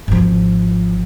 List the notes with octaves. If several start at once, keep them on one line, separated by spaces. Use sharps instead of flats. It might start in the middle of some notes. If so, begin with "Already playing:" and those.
G#1 F3